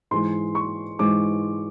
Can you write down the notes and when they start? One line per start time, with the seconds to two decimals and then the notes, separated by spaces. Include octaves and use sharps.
0.11 G#2 E3 G#3 C6
0.55 C#6
0.99 G#2 E3 G#3 D6